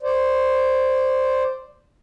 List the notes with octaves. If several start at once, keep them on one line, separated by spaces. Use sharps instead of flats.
C5 D5